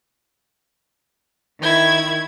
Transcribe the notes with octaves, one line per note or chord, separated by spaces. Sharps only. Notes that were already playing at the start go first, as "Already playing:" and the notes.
D#3 E4 G#6